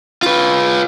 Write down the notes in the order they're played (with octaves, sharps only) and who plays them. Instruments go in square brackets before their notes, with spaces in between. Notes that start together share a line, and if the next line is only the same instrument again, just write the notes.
[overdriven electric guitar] F4 B4